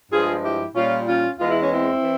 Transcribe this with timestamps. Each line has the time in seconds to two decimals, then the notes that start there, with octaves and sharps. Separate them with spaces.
0.11 G2 F3 G#3 F4 G#4
0.44 E4 G4
0.75 A#2 G3 C#4 F4
1.07 C#4 F4
1.39 E2 E3 G#3 F4
1.50 E4
1.62 C#4
1.73 C4 E4
2.02 E3